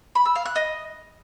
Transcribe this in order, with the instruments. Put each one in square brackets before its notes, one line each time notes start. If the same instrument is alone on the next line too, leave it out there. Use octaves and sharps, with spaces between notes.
[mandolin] B5
E6
F5
F#6
D#5